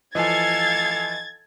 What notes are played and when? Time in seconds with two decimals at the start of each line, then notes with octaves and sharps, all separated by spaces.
0.15 E3 F3 A4 D#5 F5 G#5 G#6 A6